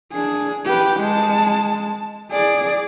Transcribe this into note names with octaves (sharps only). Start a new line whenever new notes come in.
D4 G#4
G4 B4
G#3 A5
G#4 D5